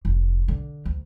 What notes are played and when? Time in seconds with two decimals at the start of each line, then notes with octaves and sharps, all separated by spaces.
0.05 F1
0.48 D3
0.85 D2